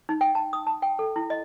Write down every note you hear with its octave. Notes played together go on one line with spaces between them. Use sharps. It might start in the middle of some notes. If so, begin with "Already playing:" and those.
D#4
G5
A5
D#6
A5
G5
A4
E4
D#5